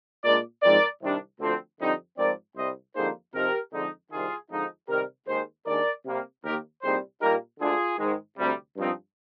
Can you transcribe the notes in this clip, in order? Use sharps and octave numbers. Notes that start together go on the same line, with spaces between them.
A#2 G#3 D4 A#4 D5
G#2 F3 G#3 C4 A#4 D5
C2 C3 D#3 G3 D4
D2 D3 F3 C4
F2 D3 G3 C4 D#4
G#2 F3 C4 A#4 D5
C2 C3 G3 C5 D#5
F2 D3 G3 A#3 D#4 G#4 C5
C3 F3 C4 D#4 G4 A#4
F2 D3 G#3 D#4
C2 C3 D#3 F4 G#4
F2 D3 F3 G#3 D#4
C3 D#3 G3 G4 A#4
D#2 D#3 G#3 G#4 C5
D#2 D#3 G#3 D4 A#4 D5
C3 G3 A#3
D#2 D#3 A#3 G4 A#4
C2 A#2 G3 C4 D#4 G#4 C5
A#2 G3 A#3 D#4 G4 A#4
D2 D3 G#3 D4 F4 G#4
G#2 D#3 G#3
D2 C3 G3
G2 F3 C4 D#4